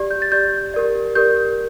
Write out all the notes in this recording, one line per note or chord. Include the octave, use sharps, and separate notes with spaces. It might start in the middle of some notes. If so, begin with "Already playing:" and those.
Already playing: G4 D5
G6
A6
G4 D5 G6
G4 A#4 D5
G4 A#4 D5 G6